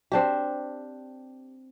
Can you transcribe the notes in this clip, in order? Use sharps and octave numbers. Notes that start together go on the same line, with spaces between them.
C4 D4 G4